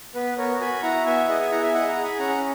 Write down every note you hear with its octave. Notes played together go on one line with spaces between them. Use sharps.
B3 B4
B3 A#4 C#5
F#4 G#5 B5
E4 F#5 A#5
B3 E5 G#5
G#4 D#5 F#5
E5 G#5
E4 F#5 A#5
E5 G#5
G#4 D#5 F#5
F#5 A#5
G#4
G#5 B5
C#4 F#5 A#5